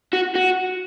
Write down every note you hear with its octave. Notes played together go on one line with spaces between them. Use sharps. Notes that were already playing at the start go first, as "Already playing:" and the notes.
F#4
F#4